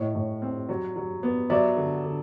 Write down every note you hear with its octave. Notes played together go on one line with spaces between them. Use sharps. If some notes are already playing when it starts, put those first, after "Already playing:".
Already playing: A2 C#5 D#5
A2
C4
F#3
F#3
B3
F#3 D5 E5
D3
D3